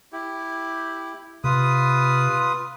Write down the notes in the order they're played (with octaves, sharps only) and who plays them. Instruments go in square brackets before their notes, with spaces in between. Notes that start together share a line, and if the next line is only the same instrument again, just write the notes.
[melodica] E4 G4
[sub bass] C3 [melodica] F4 B4 D#6